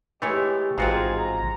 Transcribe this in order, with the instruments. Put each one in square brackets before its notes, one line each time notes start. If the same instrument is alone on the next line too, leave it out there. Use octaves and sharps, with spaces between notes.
[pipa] E3 G#3 [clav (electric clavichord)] A3 C#5 [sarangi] G4
[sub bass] A1 [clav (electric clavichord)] G#2 F4 F#4 [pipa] F3 G#3 C4 [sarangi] G#4
[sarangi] A#5